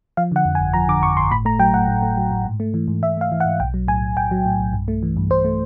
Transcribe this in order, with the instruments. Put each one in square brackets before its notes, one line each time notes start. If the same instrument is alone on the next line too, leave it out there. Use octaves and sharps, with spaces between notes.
[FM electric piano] F3 F5
D3 F#5
F2
G#5
G1
F3 A#5
D3 D6
F2 C#6
G1 C6
A2 B5
A3 A#5
F#3 G5
A2 F#5
A2
A3
F#3
A2
G#2
A3
E3
G#2
G#2 E5
A3 F5
E3
F#5
G#2
B1 G5
F#3
A2 G#5
B1
B1 G5
F#3
A2
B1
G2
A3
E3
G2
G2 C5
A3